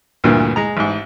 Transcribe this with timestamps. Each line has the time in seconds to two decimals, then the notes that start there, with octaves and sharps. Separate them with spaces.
0.24 D2 G2 A#2 D3 E3
0.56 G#3 A#5
0.77 A1 G#2